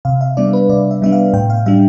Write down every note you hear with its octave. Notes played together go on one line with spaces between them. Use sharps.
C3 F5
E5
G3 B3 D4 D5
B4
C3 D5
E5
G3 B3 D4 E5
F5
A2 G5
F5
G3 D4 E5